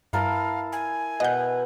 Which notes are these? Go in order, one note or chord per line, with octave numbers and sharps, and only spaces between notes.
G2 E4 A#4 F5 A5
G#5
B2 D#5 F#5 G6